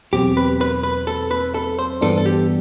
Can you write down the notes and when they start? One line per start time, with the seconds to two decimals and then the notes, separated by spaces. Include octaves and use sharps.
0.13 E2 B2 F#3 C4 G4
0.37 B4
0.61 B4
0.83 B4
1.07 A4
1.31 B4
1.54 A4
1.79 C5
2.01 G2 E3 B3 D4 A4
2.18 A4
2.26 G4